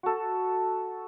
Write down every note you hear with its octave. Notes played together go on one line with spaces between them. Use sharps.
F#4 A4